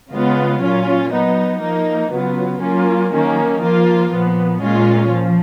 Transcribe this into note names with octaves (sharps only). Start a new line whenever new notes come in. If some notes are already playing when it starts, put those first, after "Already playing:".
C#3 G#3 B3 F4
A#2 F#3 C#4 F4
F#3 B3 D#4
F3 A#3 D#4
C#3 F#3 B3 F4
F#3 A#3 C#4 F4
D#3 F#3 A#3 C#4
F3 A#3 F4
A#2 F3 B3
A#2 G#3 C#4 F4
F3